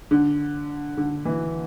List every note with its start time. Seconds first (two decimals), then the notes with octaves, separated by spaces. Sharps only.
0.11 D3
0.97 D3
1.25 E3